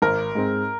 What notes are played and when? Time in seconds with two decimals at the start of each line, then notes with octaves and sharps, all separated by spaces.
0.02 G#1 A#4
0.35 G#2 G#3 C4